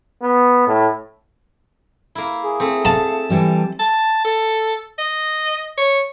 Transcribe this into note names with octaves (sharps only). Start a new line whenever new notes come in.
B3
A2
A#3 E4
G#4
A3 C4
F5 A5
E3 G3 A4
A5
A4
D#5
C#5